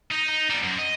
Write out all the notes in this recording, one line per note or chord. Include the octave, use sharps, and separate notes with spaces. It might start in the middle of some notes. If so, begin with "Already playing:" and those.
D#4
D#4
G3 B3
F#2
D#5